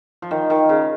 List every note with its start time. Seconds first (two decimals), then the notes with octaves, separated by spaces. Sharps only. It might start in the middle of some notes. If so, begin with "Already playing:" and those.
0.22 F3
0.31 D#3
0.50 D#3
0.69 C#3